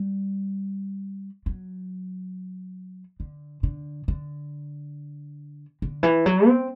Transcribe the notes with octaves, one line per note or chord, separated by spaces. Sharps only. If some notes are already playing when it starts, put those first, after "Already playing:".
Already playing: G3
F#3
D3
D3
D3
D3
E3
F#3
C4